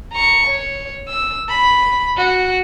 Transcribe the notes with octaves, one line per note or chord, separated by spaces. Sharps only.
A#5 C#6
C#5
E6
B5
F#4